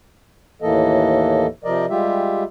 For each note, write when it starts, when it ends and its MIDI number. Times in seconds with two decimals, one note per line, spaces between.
0.62 1.46 39
0.62 1.46 45
0.62 1.46 52
0.62 1.46 58
0.62 1.46 69
0.62 1.46 75
1.64 1.86 48
1.64 1.86 53
1.64 1.86 70
1.64 1.86 74
1.64 1.86 75
1.90 2.43 55
1.90 2.43 56
1.90 2.43 65
1.90 2.43 67
1.90 2.43 76